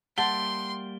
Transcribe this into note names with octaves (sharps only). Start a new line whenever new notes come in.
G3 A#3 E5 F#5 G5 A5 C6 G7